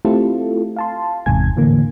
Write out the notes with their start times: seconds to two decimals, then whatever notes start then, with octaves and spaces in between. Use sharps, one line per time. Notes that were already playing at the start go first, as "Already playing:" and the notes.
0.05 A3 C4 E4 F4 G4 A4
0.76 F5 A5 C6
1.26 G1 E2 G#2 C3 G#5 G#6
1.57 A2 D3 E3 A#3